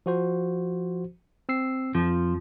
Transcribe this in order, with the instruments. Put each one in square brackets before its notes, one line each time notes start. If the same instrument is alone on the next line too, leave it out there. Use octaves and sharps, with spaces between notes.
[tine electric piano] F3 F#4 C5
C4 E6 C7
[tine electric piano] F2 [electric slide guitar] F3